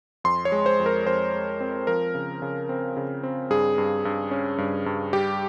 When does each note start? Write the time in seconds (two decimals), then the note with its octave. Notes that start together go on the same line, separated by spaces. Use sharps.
0.24 F2 C6
0.45 C#5
0.52 G#3
0.66 C5
0.80 F2
0.86 A#4
1.06 F2 C5
1.33 G#3
1.60 C4
1.87 F3 A#4
2.15 C#3
2.42 C#3
2.69 C4
2.97 C#3
3.23 C4
3.50 G2 G#4
3.78 G2
4.05 G2
4.31 C#4
4.58 G2
4.86 G2
5.13 G3 G4